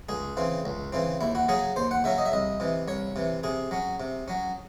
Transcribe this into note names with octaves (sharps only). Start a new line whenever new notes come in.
C#2 G#4
C#3 E3 C4
C#2
C#3 E3 C4
D#2 E4
F#4
C#3 F#3 C#4 G#4
D#2 C5
F#5
C#3 F#3 C#4 E5
D#5
E5
C2 D#5
C3 E3
C2 C#5
C3 E3
C3 G#4
F#3 C#4
C3
F#3 C#4